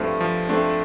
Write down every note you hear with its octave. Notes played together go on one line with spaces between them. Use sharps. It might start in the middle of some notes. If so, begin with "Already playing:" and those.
Already playing: G2 F3 A3 C4
F3
A3 C4 D4